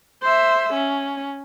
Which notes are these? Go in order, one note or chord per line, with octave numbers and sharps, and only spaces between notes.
C5 E5
C#4